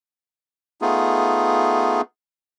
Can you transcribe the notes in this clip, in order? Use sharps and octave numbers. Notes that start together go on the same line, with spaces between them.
A3 B3 D#4 F4 G#4